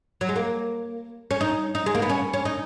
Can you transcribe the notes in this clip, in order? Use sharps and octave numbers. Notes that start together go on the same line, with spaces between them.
F#3
G#3
A#3
C#4
D#4
D#4
G#3
A#3
B3
C#4
C#4
D#4